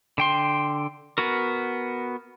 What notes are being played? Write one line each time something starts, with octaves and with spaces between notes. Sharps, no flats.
D3 G5 C6
B3 F#4 A#4